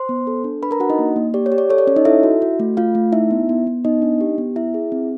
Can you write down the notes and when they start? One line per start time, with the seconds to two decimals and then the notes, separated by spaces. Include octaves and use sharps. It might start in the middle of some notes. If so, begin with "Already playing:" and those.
Already playing: C5 C6
0.09 B3
0.27 A4
0.44 D4
0.62 D4 B4 B5
0.71 A#4 A#5
0.80 D4 F#4 F#5
0.90 D#4 D#5
0.99 A#3
1.16 A#3
1.34 G4 D5
1.46 C#5
1.52 G4
1.58 D5
1.70 A4 C#5
1.78 D5
1.87 C#4 C#5
1.96 D#4 D#5
2.05 E4 A4 E5
2.23 F#4
2.42 F#4
2.59 A3
2.77 A3 F4 F5
2.95 A3
3.13 D#4 E4 E5
3.31 B3
3.49 B3
3.67 B3
3.85 B3 D#4 D#5
4.02 D4
4.21 G4
4.38 B3
4.56 E4 E5
4.74 G#4
4.92 C4